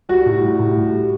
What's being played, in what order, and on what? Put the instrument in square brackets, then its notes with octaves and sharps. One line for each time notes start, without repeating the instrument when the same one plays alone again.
[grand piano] G3 F#4
A2
G3
A2
G3
G3